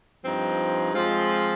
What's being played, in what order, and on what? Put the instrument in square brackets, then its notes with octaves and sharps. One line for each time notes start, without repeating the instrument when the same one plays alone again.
[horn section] G2 F3 C4 D#4
F3 G#3 C4 F4